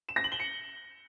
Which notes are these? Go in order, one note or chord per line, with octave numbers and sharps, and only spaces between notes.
E7
A#6
F#7
G7
C#7